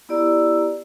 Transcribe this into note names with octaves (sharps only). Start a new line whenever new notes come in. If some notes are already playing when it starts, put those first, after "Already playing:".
B3 E4 G4 D5 A#5 E6